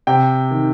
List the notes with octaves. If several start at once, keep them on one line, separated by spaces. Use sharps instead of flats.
C3 G5
D#3